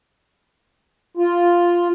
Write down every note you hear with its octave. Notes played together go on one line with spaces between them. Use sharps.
F4